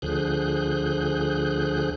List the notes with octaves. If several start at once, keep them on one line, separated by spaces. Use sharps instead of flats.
D2 D3 F3 G#4 F#6 G6